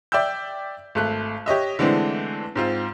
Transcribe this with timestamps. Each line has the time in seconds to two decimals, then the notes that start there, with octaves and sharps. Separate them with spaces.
0.12 D5 E5 G5 E6 G6
0.95 G#1 A3 F#6
1.46 G4 C#5 D#5 E5
1.79 D3 E3 G#3 A3 C4 D4
2.55 G#2 C4 F4